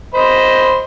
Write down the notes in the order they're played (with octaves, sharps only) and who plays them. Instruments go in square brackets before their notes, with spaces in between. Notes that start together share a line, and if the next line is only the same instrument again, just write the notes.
[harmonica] C5 D#5 B5